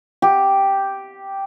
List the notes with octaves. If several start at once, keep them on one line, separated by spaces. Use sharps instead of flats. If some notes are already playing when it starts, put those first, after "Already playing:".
G4